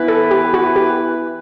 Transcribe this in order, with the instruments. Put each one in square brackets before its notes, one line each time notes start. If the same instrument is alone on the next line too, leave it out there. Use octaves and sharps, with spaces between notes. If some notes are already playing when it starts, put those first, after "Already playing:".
Already playing: [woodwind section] E3 B3 E4 B4
[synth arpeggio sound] A4
G4
F#4
G4